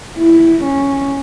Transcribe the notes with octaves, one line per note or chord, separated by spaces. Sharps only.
E4
C#4